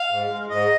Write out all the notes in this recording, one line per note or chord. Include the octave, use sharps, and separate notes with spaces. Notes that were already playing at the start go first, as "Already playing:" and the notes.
Already playing: F5
G#2
G#3
G#2 D#5